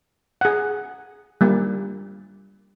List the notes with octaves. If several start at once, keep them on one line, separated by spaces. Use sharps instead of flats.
G#4 F#5
G3 A#3